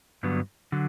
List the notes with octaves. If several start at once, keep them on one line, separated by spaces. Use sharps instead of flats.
G2 D3 F#3 B3
D3 F#3